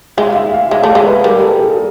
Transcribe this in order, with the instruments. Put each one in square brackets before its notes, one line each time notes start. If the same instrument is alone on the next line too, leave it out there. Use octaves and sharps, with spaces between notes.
[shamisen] G#3 [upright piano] E5
[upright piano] F5
E5
F5
[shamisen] G#3 [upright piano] E5
[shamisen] A3
[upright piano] F5
[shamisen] G#3
[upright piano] B4
[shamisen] G3 [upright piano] A#4
[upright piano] A4
G#4